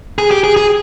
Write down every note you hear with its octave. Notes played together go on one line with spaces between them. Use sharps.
G#4
G4
G#4
G#4